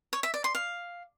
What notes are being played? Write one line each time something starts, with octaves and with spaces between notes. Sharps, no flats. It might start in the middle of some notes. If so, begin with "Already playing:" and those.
C#5
E5
D5
C6
F5